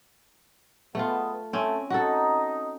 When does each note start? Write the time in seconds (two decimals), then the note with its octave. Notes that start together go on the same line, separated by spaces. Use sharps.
0.95 G#3 A3 B3 F4
1.53 A3 C4 C#4
1.90 D#4 F#4 A4